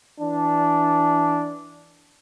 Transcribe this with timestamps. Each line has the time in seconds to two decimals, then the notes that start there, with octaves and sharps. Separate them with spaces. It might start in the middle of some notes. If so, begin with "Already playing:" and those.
0.21 E3 D4